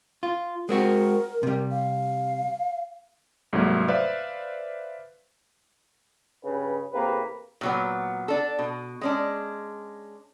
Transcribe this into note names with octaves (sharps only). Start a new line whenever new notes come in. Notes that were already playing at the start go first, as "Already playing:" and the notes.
F4
G#3 C4 F#4 A#4
C3 G3
F5
C2 G#2 F#3 A3 A#3
B4 C5 D5 E5 F5
G2 C#3 B4
A1 C3 A#3 G#4 B4
A#2 F#3 B3
D4 A4
B2
G#3 C#4 D4